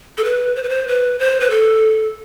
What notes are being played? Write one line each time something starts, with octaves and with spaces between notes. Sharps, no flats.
A4
B4
C5
B4
C5
B4
C5
B4
A4